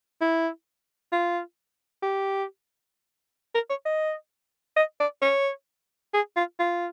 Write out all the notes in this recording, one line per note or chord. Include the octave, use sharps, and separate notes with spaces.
E4
F4
G4
A#4
C#5
D#5
D#5
D5
C#5
G#4
F4
F4